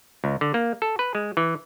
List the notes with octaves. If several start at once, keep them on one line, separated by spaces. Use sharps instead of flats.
C#2
D3
A#3
A4
B4
G#3
E3